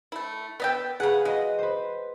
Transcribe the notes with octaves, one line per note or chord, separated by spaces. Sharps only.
A3 E4
B3 D#5 G5 E6 A6 B6
C#3 G#4 B4 F5 F#5
G#3 F#4 D#5
B4 C5